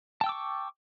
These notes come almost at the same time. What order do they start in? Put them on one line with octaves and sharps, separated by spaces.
A5 G5 E6 D6 C#6